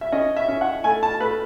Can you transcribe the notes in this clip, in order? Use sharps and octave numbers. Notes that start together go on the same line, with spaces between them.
E5
C#4 D#5
E5
C#4
F#5
A3 G#5
A5
A3 B4